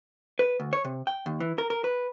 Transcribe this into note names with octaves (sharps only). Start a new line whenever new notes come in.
B4
D2
C#5
C3
G5
D#2
E3
A#4
A#4
B4